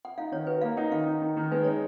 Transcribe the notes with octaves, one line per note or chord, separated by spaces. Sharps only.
F#5
D#4 F5
D#3 C#5
F#4 B4
A#3 F5
D#4 F#5
D#3 F5
D#4
D#3
D#3
G#3 B4
D#4 C#5